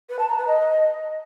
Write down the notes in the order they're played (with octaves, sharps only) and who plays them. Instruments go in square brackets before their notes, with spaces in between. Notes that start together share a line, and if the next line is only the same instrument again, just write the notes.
[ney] B4
A5
A#5
B4
D#5